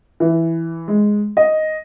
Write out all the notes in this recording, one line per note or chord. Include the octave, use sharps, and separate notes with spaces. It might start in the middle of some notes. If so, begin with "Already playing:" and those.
E3
G#3
D#5